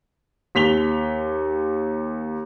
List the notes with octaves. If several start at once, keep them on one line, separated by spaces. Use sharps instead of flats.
D#2 B6 F7 G7